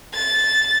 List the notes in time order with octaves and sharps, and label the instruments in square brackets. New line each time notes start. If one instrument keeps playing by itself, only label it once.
[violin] A6